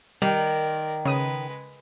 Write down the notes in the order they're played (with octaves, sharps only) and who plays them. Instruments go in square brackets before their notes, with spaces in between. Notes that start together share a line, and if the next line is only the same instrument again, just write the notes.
[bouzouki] D#3 [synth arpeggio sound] G3 [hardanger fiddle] A#4 D5
[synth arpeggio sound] C#3 D#6 D#7 [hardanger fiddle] G#3 B4